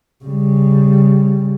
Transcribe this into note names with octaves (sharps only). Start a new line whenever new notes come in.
C#3 G3